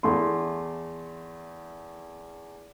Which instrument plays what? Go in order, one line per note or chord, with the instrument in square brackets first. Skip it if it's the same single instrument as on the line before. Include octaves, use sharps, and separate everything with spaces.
[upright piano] E2 A3 C6